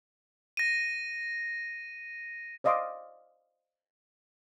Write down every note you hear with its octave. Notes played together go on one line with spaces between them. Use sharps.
A#6 D#7
C5 D5 D#5 F5 C6 D6